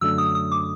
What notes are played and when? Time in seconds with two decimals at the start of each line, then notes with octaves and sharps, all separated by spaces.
0.01 F#2 D3 F#3 A3 D4 E6
0.18 D#6
0.35 D#6
0.52 D6